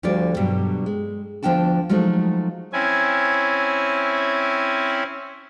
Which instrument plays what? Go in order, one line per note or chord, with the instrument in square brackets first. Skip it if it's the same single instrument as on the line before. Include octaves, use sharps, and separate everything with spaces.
[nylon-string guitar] D2 D3 F3 G3 F#4 D5
G2 B2 D3 F#3 G3
G#3
D2 F3 B3 D4 G5 A5
F3 F#3 G#3 A3 D#4
[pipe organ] C4 C#4 E4 G#5